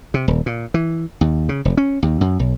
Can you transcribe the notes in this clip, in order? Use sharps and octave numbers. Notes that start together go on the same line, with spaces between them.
C3
D#1
A#2
E3
D#2
C#3
F1
C#4
D#2
F#2
B1